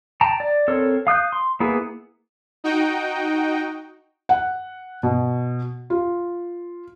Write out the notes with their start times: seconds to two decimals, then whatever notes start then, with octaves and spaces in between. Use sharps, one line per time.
0.21 G5 A5 A#5
0.40 D5
0.68 C4 A4 A#4 C#5
1.07 F5 D#6 F#6 G6
1.32 C6
1.60 A#3 B3 E4 G#4 B4
2.64 D#4 F#4 G5
4.29 F#5
5.03 B2
5.90 F4